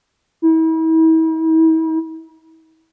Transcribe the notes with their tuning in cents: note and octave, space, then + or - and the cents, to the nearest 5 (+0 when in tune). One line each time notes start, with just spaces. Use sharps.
E4 -40